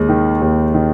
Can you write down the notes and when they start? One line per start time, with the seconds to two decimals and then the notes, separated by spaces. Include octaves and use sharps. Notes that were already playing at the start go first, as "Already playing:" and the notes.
Already playing: D#2 G#3
0.09 D#3
0.41 D#2
0.74 D#3